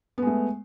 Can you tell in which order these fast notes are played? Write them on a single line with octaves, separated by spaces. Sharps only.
B3 G#3 A3